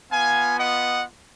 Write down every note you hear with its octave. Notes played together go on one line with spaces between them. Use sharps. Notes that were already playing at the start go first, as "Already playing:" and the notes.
B3 F4 F5 G#5
D#5 F#5